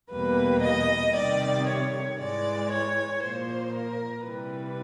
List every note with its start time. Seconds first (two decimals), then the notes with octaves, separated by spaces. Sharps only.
0.10 E2 B2 G3 A#3 B4
0.62 D#5
1.14 C3 D#3 G3 D5
1.66 C#5
2.18 G#2 E3 G#3 D5
2.70 C#5
3.22 A#2 F3 A#3 C5
3.74 A#4
4.26 C3 E3 G3 B4